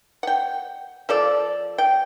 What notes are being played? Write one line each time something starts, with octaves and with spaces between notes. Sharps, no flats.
F#5 G5
F3 A4 D5
G5